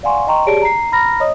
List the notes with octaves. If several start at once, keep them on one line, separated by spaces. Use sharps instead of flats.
D5 F5 F#5 G#5 C6 C#6
D#5 G5 A#5 C6 C#6
G4 G#4 C#5 D5 A5 D7
A#5 C7
A#5 B5 F6 A#6
C#5 D#5 D#6